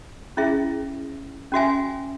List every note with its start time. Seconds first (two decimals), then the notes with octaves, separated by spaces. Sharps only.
0.37 C#4 E4 G#4 E5
1.52 C#4 F#4 E5 G#5